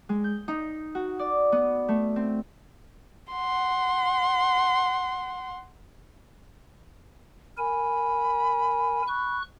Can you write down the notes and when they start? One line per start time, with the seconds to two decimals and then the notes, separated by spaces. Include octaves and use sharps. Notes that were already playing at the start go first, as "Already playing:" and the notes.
0.09 G#3
0.24 G6
0.48 D#4
0.95 F#4
1.19 D5
1.52 B3
1.88 A3
2.16 C4
3.33 F#5 C6
7.58 A#4 G#5 B5
9.07 C#6 F#6